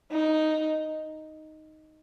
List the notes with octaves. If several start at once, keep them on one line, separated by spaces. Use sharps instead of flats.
D#4